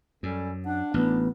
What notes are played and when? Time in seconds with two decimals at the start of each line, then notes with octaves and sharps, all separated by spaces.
0.23 F#2 G3 C#4 A4
0.66 D4 F#5
0.94 A1 B3